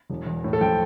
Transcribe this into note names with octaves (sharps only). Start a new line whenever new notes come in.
E1
E2
A2
A4
F3 G5